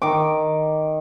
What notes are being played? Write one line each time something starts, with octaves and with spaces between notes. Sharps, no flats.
D#3 D6